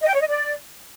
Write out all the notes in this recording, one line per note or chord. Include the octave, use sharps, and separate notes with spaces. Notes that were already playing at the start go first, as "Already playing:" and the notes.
D#5
G5
C#5
D#5
D5